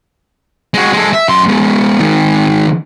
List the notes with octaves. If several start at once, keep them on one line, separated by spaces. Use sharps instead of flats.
G#3 F#4
G#3 A4
E5
F#2 C6
G#3 B3
D#3 G#3